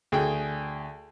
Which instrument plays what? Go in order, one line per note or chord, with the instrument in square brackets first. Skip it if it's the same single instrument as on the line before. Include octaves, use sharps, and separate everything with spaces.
[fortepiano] D2 G#4 G5